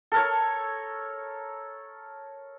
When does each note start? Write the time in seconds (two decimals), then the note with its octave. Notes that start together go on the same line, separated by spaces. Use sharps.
0.12 A4 A#4 C#5